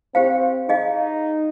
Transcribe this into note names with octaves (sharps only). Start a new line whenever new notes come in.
C4 G4 C5 F5
D#4 G#4 D#5 F5